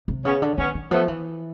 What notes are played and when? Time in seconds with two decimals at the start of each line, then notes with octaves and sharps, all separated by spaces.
0.08 C3
0.25 C#3 B3 C#4
0.42 D3
0.58 D#3 B3 C#4
0.75 D#3
0.91 F3 A3 B3
1.08 E3